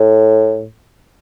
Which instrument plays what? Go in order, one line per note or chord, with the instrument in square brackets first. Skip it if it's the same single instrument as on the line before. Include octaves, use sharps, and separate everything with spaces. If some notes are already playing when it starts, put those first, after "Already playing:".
Already playing: [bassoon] A2